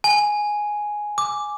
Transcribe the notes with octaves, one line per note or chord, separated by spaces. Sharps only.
G#5
D6